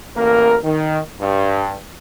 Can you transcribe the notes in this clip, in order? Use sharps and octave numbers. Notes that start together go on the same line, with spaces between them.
A1 A#3 A#4
D#3
G2